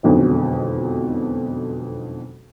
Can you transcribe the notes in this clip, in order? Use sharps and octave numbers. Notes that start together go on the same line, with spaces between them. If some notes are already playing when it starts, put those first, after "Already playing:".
E1 B1 F2 B2 D3 D#3